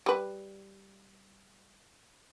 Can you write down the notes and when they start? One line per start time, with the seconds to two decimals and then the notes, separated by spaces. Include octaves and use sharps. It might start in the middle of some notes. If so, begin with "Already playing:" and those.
0.06 G3 B4